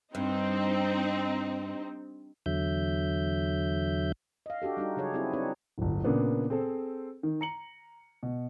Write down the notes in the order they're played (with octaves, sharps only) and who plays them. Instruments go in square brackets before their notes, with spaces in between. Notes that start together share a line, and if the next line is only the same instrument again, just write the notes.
[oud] G2 [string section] C4 D#4
[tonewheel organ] E2 D3 F#3 E5 G6
[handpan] D#5 F5
D4 F#4 G4 A4
G3 D4 D#4 F#4
C#3 F#3 G#4 C#5 D5
C4 E4 F#4 G#4
C4 D4 D#4 B4 C#5
[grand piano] D1 G1
A#2 C#3 A#3 B3 D4
C4 G#4 A4 C5
D#3
A#5 C#7 F#7
B2